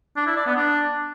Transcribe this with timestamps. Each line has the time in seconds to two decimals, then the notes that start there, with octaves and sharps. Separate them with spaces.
0.16 D4
0.26 E4
0.36 D5
0.46 B3
0.56 D4